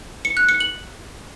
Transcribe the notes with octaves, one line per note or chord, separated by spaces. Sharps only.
C#7
F#6
C#7
F#7